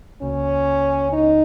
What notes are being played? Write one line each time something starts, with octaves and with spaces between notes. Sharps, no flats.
C#2 C#3 A#3 C#4 F#4
D#4